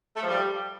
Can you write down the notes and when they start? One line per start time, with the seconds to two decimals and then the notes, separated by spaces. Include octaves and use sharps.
0.16 A3
0.22 F3
0.28 G3